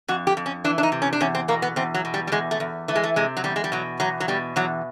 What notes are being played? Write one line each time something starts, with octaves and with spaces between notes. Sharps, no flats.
F2 F#4
G4
F2
C#4
E3 D4
D4
D#4
C3
C#4
D4
E2 C#4
C4
B2 A#3
B3
E2 C4
F#3
B2
G3
G3
E2 G#3
A3
E2
E3 A3
G#3
A3
C3 G#3
F#3
E2 G3
G#3
G3
B2 F#3
E2 F#3
F#3
B2 G3
E2 F#3